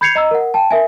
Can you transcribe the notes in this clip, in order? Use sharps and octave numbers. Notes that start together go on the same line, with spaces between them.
B5 G6 G#6 C7 C#7 F7
D#5 A#5 E6
A#4 F#5
G5 A5
A#4 E5 G#5